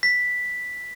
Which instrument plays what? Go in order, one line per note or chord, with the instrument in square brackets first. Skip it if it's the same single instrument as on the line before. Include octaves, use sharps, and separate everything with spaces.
[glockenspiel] B6